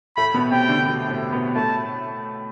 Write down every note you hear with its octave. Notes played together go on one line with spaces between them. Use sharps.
A2 A3 B5
B2 B3
C3 C4 G5
D3 D4
B2 B3
A2 A3
B2 B3
A2 A3 A5